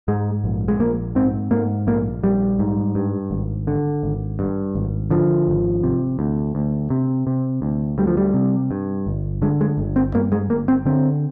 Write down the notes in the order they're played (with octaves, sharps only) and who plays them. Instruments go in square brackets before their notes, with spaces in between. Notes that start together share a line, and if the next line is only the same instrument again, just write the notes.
[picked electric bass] G#2 G#3
A#1
G#3
A#1 A#3
G#2 C4
G#2 A#3
A#1 A#3
A#1 G3
G#2
G2
G#1
D3
G#1
G2
G#1
D3 F3
G#1
C3
D2
D2
C3
C3
D2
D2 G3
F3
G3
C3
G2
G1
D3 G#3
G#3
G1
C4
G2 A#3
G#3
G1 A#3
C4
D3 C4